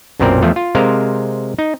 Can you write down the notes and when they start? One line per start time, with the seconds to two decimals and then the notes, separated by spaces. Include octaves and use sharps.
0.20 B1 F#2 A#2 C4 A#4 D5
0.42 E2 F3 A3
0.56 F4
0.75 C3 G#3 A#4 C5 F5
1.59 D#4